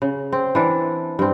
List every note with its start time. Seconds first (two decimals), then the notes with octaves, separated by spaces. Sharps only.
0.02 C#3
0.32 C4
0.55 E3 D4
1.19 G2 C4